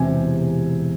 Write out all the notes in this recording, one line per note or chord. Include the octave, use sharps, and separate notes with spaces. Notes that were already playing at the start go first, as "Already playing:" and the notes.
Already playing: E1 E2 C3 G#5